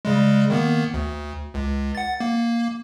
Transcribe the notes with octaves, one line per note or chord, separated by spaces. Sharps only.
C#3 G3 G#3
D#3 A#3 B3
D2
C#2
F#5 A6
A#3